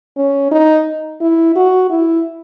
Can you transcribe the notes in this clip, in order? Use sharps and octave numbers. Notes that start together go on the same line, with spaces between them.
C#4
D#4
E4
F#4
E4